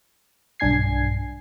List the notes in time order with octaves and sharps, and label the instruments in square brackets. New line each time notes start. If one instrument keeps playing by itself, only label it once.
[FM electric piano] B1 G2 D4 G#5 G#6 C7